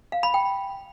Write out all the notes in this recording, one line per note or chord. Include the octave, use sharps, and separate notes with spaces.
F5
B5
G5